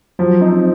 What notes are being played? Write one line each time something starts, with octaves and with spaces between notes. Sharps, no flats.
F3 F#3
C4 D#4